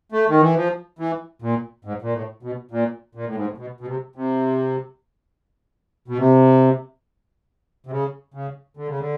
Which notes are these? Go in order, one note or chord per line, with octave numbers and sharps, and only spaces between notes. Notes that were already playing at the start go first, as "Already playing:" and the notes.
A3
D#3
E3
F3
E3
A#2
G#2
A#2
A2
B2
A#2
A#2
A2
G#2
A2
B2
B2
C3
C3
B2
C3
C3
C#3
C#3
D3
C#3
D3